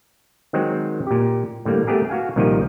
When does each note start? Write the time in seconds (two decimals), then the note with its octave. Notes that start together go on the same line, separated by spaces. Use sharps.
0.53 D#3 F#3 G#3 C4
1.07 A#2 G4
1.65 A2 D3 G3 A#3
1.87 A3 B3 G4 G#4 A#4
2.10 F#4 F5 G#5
2.36 C2 A#2 D#3 F3 G4 D#5